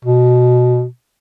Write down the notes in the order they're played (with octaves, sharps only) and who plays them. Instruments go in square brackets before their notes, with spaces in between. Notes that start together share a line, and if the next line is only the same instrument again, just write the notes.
[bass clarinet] B2